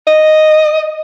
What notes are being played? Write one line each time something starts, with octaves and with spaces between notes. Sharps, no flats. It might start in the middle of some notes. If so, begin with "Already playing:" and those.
D#5